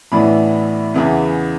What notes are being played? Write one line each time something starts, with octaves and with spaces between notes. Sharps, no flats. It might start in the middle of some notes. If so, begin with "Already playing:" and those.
A1 A2 E3 B3 D4 B5
E2 C#3 E3 B3